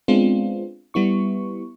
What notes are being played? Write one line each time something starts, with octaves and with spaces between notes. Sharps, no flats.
G#3 B3 C4 D4 F4
G3 B3 E4 C#6